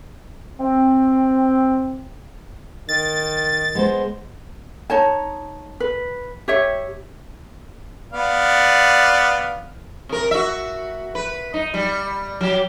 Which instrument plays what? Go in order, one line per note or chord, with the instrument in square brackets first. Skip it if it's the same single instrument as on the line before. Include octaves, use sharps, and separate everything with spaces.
[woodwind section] C4
[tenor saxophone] D#3 [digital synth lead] A6
[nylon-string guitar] G#3 B3 C5
[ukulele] D#4 C#5 A5
B4
G4 C#5 E5
[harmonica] B3 D5 F5
[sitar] C3 A#4
F#4 E5
B4
D#4
G3
F#3 G4